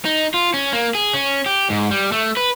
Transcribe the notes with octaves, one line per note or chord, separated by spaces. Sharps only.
D#4
F4
C#4
A#3
G#4
C#4
G4
G#2
G3
A3
B4